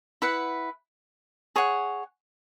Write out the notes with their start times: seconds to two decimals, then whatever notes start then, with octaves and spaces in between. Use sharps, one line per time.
0.22 E4 B4 F#5
1.56 G#4 C#5 F#5